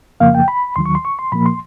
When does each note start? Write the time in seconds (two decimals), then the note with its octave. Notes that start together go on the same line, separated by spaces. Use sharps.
0.20 F2 C#3 F3 A#3 F5
0.35 G5
0.48 B5
0.76 D#2 D#3 F#3 C6
0.86 C#6
0.95 C6
1.05 C#6
1.19 C6
1.32 A#2 F3 A#3 B5
1.46 C6